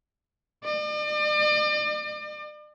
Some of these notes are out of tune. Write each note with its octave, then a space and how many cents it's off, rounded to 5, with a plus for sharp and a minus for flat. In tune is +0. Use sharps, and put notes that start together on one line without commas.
D5 +40